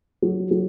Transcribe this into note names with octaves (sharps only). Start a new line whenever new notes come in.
F#3
F#3